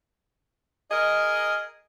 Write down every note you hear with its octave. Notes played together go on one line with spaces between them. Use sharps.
G#4 A#4 D#5